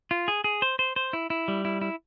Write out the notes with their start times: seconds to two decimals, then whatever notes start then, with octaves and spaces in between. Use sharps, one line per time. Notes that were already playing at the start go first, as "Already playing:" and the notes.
0.11 F4
0.28 G#4
0.44 G#4
0.62 C5
0.79 C5
0.96 C5
1.13 E4
1.30 E4
1.48 G3
1.65 E4
1.81 E4